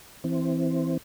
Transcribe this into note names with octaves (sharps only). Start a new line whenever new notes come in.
E3 C4